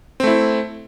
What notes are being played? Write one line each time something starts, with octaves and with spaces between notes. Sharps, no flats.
A3 C4 E4